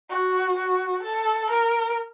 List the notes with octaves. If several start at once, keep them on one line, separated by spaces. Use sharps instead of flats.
F#4
F#4
A4
A#4